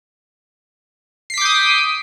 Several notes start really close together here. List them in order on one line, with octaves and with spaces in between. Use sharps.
C7 B6 D6 G6 D#6